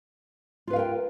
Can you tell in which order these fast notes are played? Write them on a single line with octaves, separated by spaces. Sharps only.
F4 B4 F5 A#4 G5